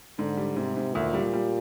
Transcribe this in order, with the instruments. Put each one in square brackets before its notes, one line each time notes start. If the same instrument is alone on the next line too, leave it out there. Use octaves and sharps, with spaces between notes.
[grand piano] G#2 [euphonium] D3
[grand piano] G3
[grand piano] G#2 [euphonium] C3
[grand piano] G#2
[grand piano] D2 [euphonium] A#2
[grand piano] G3
G3